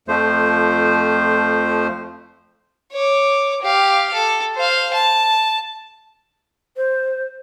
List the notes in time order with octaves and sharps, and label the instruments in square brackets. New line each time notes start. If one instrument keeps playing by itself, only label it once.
[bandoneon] F2 F3 A3 C5
[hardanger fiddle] C#5 D6
G4 F5
A4
C5 F5
A5
[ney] C5